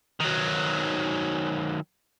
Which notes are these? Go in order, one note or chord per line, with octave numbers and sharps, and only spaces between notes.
D#3 F#3